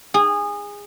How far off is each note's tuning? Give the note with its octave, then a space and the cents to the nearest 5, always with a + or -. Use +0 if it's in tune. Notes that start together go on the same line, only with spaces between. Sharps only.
G#4 -20